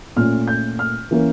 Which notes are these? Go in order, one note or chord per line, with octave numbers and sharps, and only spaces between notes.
A#2 A3 C#4 F6
G6
F6
E3 A#3 C#4